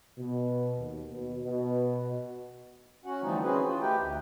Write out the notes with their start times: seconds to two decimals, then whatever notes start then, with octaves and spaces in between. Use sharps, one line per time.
0.19 B2
0.78 D#2
1.10 B2
1.42 B2
3.05 C#4 F#4 F#5
3.22 D3 E3 F3 G3 A3 D#4
3.43 C4 C#4 F#4 G#4 B4
3.66 E3 F4 F#4
3.81 A3 D#4 G4 B4 G5
3.97 D2